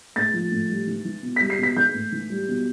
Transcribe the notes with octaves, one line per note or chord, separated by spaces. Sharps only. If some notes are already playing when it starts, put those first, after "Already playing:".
A2 A6
F3
A2
G3
E3
E3
B2
G3 B6
C7
B2 B6
E3 G6
A2
E3
G3
B2